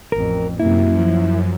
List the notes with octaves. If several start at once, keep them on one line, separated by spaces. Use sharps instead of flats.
A1 F2 A#4
F#2 C3 A#3 E4
F3